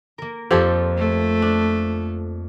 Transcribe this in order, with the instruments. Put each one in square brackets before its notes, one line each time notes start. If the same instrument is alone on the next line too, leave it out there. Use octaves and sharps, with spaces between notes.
[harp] A#3 A#4
[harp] F2 C4 G#6 [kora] F3 G4 A4
[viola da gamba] A3
[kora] D4